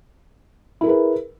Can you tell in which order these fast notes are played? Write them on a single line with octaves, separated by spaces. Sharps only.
E4 A#4 G#4 B4